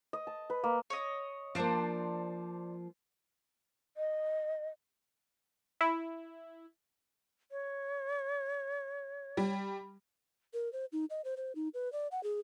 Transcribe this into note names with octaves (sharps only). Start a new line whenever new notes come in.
D#5
A5
B4
A#3
C#5 D#5
F3 A#3 D4 C5 D5
D#5
E4
C#5
G3
A#4
C5
D#4
D#5
C5
C5
D#4
B4
D5
F#5
G#4